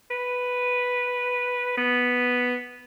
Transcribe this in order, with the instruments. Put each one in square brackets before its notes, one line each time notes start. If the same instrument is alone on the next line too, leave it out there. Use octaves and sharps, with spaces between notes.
[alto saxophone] B4
B3